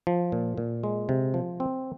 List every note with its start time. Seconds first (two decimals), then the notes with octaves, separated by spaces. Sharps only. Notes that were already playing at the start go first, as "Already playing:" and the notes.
0.07 F3
0.32 A#2
0.57 A#2
0.84 G#3
1.09 C3
1.34 F3
1.60 C4